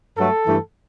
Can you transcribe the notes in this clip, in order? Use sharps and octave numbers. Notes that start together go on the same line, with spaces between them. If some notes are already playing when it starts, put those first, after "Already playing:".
G2 F#3 A3 A4
G2 E3 A3